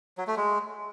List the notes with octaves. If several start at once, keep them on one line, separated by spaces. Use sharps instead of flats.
F#3
A3
G#3